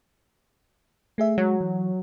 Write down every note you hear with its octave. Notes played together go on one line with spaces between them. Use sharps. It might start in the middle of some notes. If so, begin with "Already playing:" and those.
A3 G#4 E5
F#3 G#3
E3